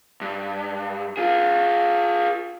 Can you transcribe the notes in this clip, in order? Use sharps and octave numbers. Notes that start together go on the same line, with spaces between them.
G2
F4 G#4